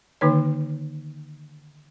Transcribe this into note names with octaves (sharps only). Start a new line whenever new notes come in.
D3 D#3 A#3 D#4 B4 C#5